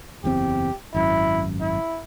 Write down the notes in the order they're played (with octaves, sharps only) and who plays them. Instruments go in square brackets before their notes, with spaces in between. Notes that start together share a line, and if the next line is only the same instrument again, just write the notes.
[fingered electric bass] F#1 E2 C4 [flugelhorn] G4
[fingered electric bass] G#1 F#2 [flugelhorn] E4
[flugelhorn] E4